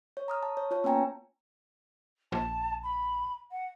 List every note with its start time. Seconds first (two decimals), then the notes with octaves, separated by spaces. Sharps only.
0.17 C#5
0.28 A#5 D#6 F6
0.43 A5
0.57 C#5
0.71 F4 C#5 A5
0.84 A#3 B3 C#4 G5 G#5 A#5
2.32 A#1 A5
2.83 B5
3.51 F#5